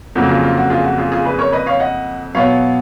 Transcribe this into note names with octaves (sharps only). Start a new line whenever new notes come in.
F2 C#3 F#3 A#3 F#4 A#4
F4 G#4
F4
F#4
F4 G#4
F#4
F4 G#4
F4 G#4
G#4 B4
A#4 C#5
B4 D#5
C#5 F5
D#5 F#5
B2 F#3 B3 C#5 F5